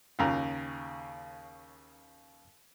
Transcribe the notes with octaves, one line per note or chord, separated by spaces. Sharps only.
D#2 C#3 A#5